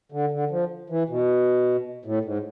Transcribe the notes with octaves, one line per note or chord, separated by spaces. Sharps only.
D3
D3
F3
E3
B2
A2
G#2